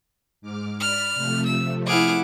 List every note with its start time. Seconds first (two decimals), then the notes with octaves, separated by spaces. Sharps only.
0.42 G#2 D6 F6
0.80 D5 B5 F6
1.14 C3 F3 A3
1.45 E6
1.86 E4 G#4 F#5 D6 F6